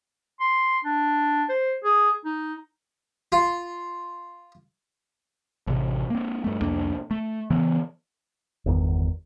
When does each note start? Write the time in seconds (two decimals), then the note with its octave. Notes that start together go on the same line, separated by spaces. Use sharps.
0.40 C6
0.84 D4
1.49 C5
1.84 G#4
2.25 D#4
3.32 F4
5.67 A1 C3
6.10 A#3 C4
6.44 G2 A3
6.61 C2 F2 A#3 D4
7.11 A3
7.50 C#3 E3 B3
8.66 G1 E2 D#3